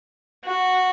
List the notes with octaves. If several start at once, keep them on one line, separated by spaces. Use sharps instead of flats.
F#4